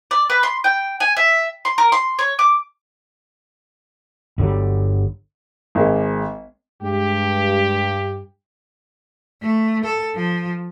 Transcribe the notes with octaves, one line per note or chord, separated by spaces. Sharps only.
D5
B4
C6
G5
G#5
E5
C6
A#4
C6
C#5
D6
G1 D3 F#3 G3
G#1 G#3
G2 G#3 G4
A3
A4
F3